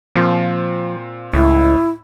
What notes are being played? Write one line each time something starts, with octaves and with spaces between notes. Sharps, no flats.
A#2 F3 C4 F4
C#2 A2 E4